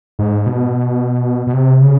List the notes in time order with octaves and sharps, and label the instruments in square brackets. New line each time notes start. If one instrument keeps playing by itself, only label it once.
[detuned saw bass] G#2
B2
B2
C3
C#3